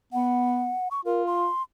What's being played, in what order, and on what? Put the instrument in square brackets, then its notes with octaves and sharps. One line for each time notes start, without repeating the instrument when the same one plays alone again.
[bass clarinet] B3 [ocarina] F#5
[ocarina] C#6
[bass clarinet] F4 [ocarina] A#4
[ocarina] C6